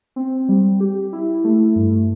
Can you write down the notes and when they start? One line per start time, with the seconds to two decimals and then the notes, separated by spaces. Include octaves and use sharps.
0.16 C4
0.49 G3
0.80 G4
1.13 E4
1.44 A3
1.76 G2